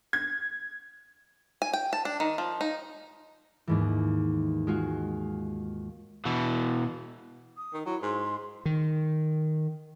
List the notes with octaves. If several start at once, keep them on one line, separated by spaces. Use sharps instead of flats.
G#6
G#5
G5
A5
D4
D#3
F3
D#4
D#2 G#2 E3
G#3 F4 F#4
B2 E3
D#6
D#3
F#3 E4
G#2 C6
D#3